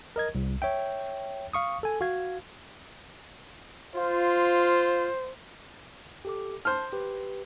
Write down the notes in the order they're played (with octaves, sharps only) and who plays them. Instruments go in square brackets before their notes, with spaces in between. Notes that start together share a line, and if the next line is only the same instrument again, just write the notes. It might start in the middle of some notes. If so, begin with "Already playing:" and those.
[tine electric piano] A#4 D#5 G#6
C2
C#5 E5 G5
F5 C#6 D#6
A4 G#5
F#4 F5 G#6
[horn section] F4 [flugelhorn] C5
[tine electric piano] G4 A4 D6
[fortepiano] C5 F6 [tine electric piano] A5
[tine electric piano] G4 B4